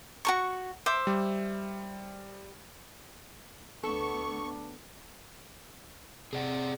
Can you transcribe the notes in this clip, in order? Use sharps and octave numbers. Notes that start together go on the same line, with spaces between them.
F#4 A4 C#6
C5 E5 D6
G3
D2 B3 D4 A4 C#6
C3 G#4 D5 F#5